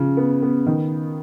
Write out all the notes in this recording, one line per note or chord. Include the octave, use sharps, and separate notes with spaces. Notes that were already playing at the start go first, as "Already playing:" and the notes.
Already playing: C#3 F3
B3
B3
D#3